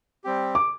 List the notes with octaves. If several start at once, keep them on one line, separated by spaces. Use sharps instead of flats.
G3 C4 G4
D6